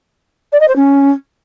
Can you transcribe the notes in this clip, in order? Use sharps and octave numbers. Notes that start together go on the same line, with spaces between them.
D5
D#5
C5
C#4